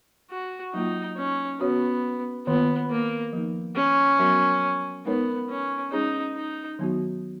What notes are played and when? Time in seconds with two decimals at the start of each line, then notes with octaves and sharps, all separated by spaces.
0.31 F#4
0.74 F#3 A#3 D#4 F4
1.17 C#4
1.60 B3 C#4 F#4 C#5
2.47 D#3 A#3 B3 F4
2.90 A#3
3.33 F3 A#3 D#4
3.76 C#4
4.19 F#3 B3 F#4 A#4 C#5
5.05 G#3 B3 D#4 A#4 C#5
5.49 C#4
5.91 G#3 C#4 D#4 G#4 C#5
6.36 D#4
6.79 D#3 F#3 B3 D#4 F#4